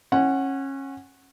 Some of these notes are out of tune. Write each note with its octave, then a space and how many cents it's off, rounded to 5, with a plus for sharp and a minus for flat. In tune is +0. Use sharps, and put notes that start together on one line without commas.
C#4 -25 F#5 +0